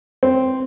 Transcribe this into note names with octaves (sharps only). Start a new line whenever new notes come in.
C4